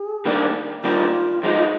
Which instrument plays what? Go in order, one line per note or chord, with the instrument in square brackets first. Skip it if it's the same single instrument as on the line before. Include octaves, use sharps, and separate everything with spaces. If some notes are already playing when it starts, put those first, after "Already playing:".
Already playing: [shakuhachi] G#4
[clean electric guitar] D#3 G3 A#3 D4
[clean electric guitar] D#3 G3 A#3 D4 [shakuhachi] F4
[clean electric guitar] F3 G#3 D#4